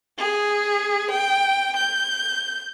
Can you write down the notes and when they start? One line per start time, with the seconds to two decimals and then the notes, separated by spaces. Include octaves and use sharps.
0.18 G#4
1.11 G5
1.76 G6